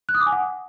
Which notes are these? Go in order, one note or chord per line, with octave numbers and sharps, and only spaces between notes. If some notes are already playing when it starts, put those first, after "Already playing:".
F#6
D#6
D6
G#5
F#5